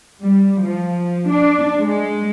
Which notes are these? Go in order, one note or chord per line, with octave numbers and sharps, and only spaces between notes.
G3
F3
D4
G#3